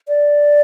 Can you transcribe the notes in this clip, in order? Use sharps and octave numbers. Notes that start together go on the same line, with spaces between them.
D5